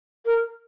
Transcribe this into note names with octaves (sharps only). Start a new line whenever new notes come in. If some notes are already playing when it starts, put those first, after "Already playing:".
A#4